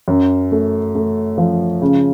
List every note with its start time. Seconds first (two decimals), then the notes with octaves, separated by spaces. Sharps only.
0.08 F#2
0.52 A3
0.95 A3
1.38 F3
1.82 C#3